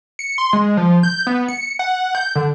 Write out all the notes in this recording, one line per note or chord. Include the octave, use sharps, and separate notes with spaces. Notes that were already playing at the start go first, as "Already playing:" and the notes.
C#7
C6
G#3
F3
G6
B3
C#7
F#5
G6
D3